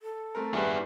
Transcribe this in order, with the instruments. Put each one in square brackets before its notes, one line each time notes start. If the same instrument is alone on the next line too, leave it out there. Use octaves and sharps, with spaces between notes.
[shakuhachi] A4
[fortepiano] A3 C4 A#4
[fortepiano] G2 G4 B4 [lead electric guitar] E4 G#4